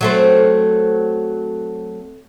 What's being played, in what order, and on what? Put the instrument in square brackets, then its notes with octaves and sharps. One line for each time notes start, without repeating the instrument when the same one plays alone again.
[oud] F#3 A3 C4